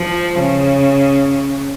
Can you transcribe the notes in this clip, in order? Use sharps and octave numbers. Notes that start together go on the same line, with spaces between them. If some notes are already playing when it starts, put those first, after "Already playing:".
Already playing: F3
C#3